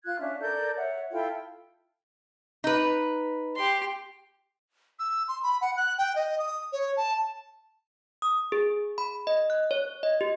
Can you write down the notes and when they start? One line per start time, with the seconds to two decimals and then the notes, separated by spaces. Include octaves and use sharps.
0.03 F4 F#6 G#6
0.19 C#4 D4 E5
0.41 A4 A#4 D5 G6
0.76 C#5 E5 F#5
1.12 E4 F4 A4 G5
2.64 D#4 B4
3.56 G4 C6
4.99 E6
5.28 C6
5.43 B5
5.61 F#5
5.77 F#6
5.98 G5
6.16 D#5
6.39 D#6
6.73 C#5
6.97 A5
8.22 D#6
8.52 G#4
8.98 B5
9.27 D#5
9.50 F#6
9.71 C#5
10.03 D#5
10.21 G4